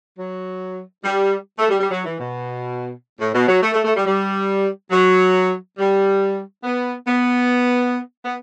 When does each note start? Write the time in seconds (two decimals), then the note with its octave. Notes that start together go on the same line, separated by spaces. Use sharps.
0.19 F#3
1.04 G3
1.59 A3
1.69 G3
1.80 G3
1.91 F#3
2.05 E3
2.20 B2
3.20 A2
3.34 B2
3.48 F#3
3.62 A3
3.73 A3
3.84 A3
3.96 G3
4.06 G3
4.91 F#3
5.78 G3
6.64 B3
7.07 B3
8.25 B3